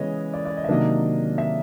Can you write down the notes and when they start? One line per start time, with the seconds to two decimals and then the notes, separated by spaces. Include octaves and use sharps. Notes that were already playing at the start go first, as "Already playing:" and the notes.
Already playing: C#3 E3 G#3 B3 C#5 D#5
0.34 D5
0.45 D5
0.57 D#5
0.64 E5
0.68 C3 D#3 F#3 A#3 D4 D#5
1.38 E5